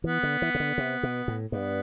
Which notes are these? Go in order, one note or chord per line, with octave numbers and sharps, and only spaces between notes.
E3 B3
D3
E3
C3
D3
C3
B2
A2
G2 B3